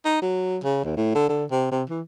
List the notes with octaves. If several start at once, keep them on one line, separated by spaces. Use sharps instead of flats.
D#4
F#3
C#3
D#2
A2
D3
D3
C3
C3
E3